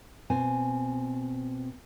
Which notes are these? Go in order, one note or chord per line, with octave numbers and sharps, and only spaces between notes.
B2 C4 G#5